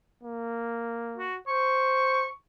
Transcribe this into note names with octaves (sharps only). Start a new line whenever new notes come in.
A#3
F#4
C5 C#6